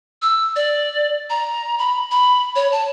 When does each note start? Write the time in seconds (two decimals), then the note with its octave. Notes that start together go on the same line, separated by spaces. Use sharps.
0.22 E6
0.56 D5
1.30 A#5
1.78 B5
2.11 B5
2.56 C#5
2.72 A5